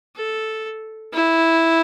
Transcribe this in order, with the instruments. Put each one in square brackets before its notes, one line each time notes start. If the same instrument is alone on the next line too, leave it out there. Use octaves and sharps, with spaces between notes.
[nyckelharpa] A4
E4